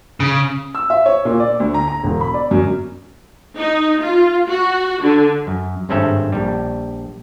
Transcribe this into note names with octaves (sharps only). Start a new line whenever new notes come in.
C#3
E6
E5
C#5
A#2
D5
D2
A#5
A#5
E1
B5
D5
F#2
D#4
F4
F#4
D3
F#2
G#1 G2 C4 C#4 A4 E5
A#1 G3